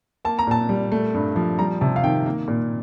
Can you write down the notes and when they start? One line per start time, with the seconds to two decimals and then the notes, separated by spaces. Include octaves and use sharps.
0.25 A#3 A5
0.39 A#5
0.47 A#2 A5
0.69 G3
0.92 A3
1.14 G2
1.36 F3
1.59 G3 A#5
1.81 C3 A5
1.96 F5
2.04 D#3 G5
2.26 A#3
2.48 A#2